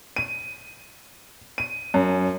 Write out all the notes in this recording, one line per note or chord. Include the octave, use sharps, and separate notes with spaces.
D#7
D#7
F#2